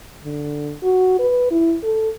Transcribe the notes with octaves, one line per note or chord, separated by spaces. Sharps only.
D3
F#4
B4
E4
A4